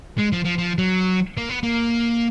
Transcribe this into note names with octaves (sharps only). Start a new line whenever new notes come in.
G#3
F3
F3
F3
F#3
A#3
B3
A#3